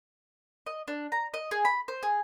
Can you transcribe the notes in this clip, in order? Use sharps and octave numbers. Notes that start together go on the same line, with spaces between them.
D#5
D4
A#5
D#5
G#4
B5
C5
G#4